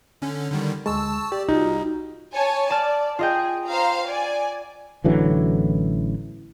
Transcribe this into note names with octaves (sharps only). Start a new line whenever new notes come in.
D3 C#4
D3 D#3 G3
D2 G#3 A5 C#6 E6
G4 D5
C2 D#4 F4 F#4
C#5 G#5 A5
D5 A5 F6
F4 G#4 D#5 G5
C5 F5 A#5
D5 G#5
A1 D3 E3 F#3